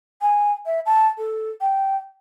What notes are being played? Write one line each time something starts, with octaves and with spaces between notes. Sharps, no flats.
G#5
E5
A5
A4
G5